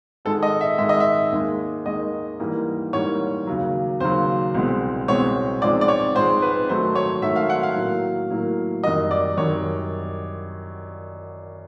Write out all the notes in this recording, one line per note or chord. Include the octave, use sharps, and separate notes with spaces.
G#2 D#3 G#3 A4
D#5
E5
G#2 D#3 G#3 E5
D#5
E5
D#2 D#3 G#3
D#2 D#3 G#3 D#5
G#2 E3 G3 A#3
G#2 E3 G3 A#3 C#5
D#2 C#3 F#3
D#2 C#3 F#3 C5
C2 B2 G#3 C4
C2 B2 G#3 C4 C#5
G#2 F3 G#3 C4 D5
D5
C#5
G#2 F3 G#3 C4 C5
B4
G#2 D#3 F#3 A3 C5
C#5
G#2 D#3 F#3 A3 E5
F5
F#5
F5
A2 F#3 A#3
A2 F#3 A#3
F#2 D#3 G3 D#5
D5
F#2 D#3 G3 C#5